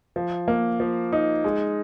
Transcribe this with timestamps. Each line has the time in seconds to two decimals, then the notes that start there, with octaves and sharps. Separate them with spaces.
0.16 F3
0.48 A#3
0.80 F3
1.12 D#4
1.44 G#3